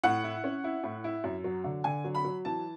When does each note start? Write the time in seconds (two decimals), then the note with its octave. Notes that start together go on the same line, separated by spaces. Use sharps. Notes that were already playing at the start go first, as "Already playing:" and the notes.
0.03 A2 F#5
0.24 E4
0.44 C#4
0.64 E4
0.84 A2
1.04 E4
1.24 F#2
1.44 F#3
1.64 D3
1.84 D3 G#5
2.04 F#3
2.15 B5
2.24 F#3
2.45 E3 A5